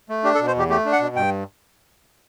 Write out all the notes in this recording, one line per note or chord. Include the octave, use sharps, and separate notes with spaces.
A3
D4 G4
A4
B2
C5
E2 G4
A3 G4
D4
F#5
B2
G2 G5